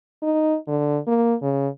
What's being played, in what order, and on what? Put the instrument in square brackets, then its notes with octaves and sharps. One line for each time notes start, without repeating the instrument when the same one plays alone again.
[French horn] D#4
D3
A#3
C#3